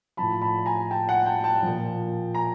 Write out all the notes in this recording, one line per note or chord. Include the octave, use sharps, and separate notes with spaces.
A2 F3 A5 B5
A5 B5
G#5 A#5
G5 A5
F#5 G#5
G5 A5
G5 A5
A#2 F3
G#5 A#5